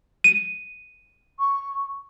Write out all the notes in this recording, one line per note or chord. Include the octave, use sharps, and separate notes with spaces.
D#7
C#6